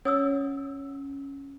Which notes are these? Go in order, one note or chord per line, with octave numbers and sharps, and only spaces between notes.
C#4 C#5 D#6 E6